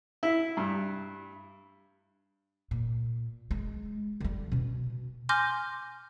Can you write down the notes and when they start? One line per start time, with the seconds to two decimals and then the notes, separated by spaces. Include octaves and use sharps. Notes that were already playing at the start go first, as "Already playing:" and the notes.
0.23 E4
0.57 G2
2.71 A#2
3.51 G#3
4.20 D3 G3
4.52 B2 C#4
5.29 G#5 C6 D6 F6 G6 A#6